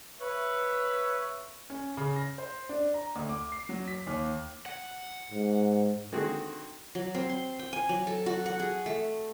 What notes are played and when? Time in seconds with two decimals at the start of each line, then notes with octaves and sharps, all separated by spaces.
0.20 B4 C#5 E5
1.70 C#4
1.97 C#3
2.16 A#6
2.38 C5
2.69 D4
2.94 A#5
3.16 D2
3.29 D6
3.52 C7
3.69 F#3
3.88 B6
4.07 D#2
4.66 F#5
5.32 G#2
6.12 D3 D#3 C4 F#4 G#4
6.95 F#3
7.15 C4
7.30 C6
7.59 G5
7.73 G#5
7.89 F#3
8.07 A4
8.26 F#4
8.46 F#5
8.59 G#4
8.86 A3